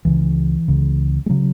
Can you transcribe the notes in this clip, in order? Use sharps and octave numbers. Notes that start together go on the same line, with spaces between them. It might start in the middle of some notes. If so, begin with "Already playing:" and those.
C#2 C#3 E3
C#2 C#3
G#3
C#3 F#3